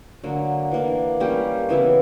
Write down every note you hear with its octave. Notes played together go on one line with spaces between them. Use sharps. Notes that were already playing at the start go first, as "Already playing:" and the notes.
D3 F#3 A#3
E3 A#3 D4
G3 A#3 C#4 G4
C#3 E3 B3 E4